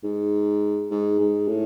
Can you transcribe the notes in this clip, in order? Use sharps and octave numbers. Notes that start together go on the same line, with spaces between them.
G#2
G#2
G#2
A2